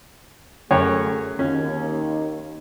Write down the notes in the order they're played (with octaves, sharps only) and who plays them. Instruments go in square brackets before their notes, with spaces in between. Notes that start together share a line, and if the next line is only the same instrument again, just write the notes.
[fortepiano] F#2 C#5 [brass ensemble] A3 G#4
[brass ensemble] D#2 [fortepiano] C#4